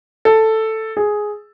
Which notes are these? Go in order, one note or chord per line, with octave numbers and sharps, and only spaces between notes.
A4
G#4